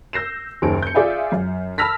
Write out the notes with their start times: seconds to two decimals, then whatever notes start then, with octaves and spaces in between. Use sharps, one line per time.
0.13 E6 G6 A#6 C7 E7
0.62 F#1 D#2 D7
0.83 G6 C#7
0.95 F4 G#4 D5 E5 F5 G#5
1.32 F#2
1.78 A5 B5 E6 F6 A#6 B6